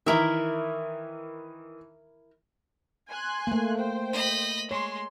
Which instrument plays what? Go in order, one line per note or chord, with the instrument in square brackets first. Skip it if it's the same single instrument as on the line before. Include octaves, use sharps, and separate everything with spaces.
[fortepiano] D#3 E3 [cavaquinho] E4 A#4 E5
[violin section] G#5 C6 F#6
[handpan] A3 A#3
[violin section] C5 G5
[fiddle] D#5 B5
[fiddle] G#3 [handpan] C#5 [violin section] C6